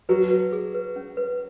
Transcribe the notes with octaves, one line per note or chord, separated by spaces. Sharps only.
F#3 B4
B4
G#4
B4
C#4
B4